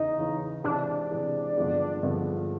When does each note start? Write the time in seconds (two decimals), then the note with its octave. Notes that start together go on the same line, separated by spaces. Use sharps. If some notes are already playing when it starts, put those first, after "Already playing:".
Already playing: E2 C#3 E3 D#4
0.18 E2 C#3 E3
0.64 C3 E3 G#3 D4
1.11 C3 E3 G#3
1.56 G2 D3 F3 G#3 B3
2.03 G2 D3 F3 G#3 B3